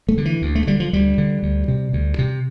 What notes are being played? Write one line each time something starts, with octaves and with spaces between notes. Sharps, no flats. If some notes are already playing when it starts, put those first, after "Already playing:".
A3
D3
E3
D2
A3
D3 G3
F3
D2 G3
D3
D2
C3
D2
C3